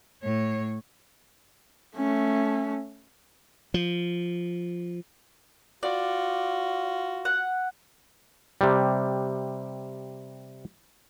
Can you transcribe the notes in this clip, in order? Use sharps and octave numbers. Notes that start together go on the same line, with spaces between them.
A2 C#5
A3 C#4
F3
F4 F#4 D5
F#5
C3 G3